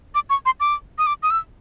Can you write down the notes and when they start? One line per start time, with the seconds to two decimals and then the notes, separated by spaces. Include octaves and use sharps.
0.15 D6
0.30 C#6
0.46 C6
0.60 D6
0.98 D#6
1.07 D6
1.23 D#6
1.30 E6